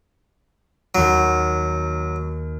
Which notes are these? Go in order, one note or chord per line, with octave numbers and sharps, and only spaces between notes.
D#2 F#3 F#4